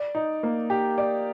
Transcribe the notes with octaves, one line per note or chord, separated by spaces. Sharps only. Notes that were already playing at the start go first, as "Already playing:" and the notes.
Already playing: D5
D#4
A#3
G4
D5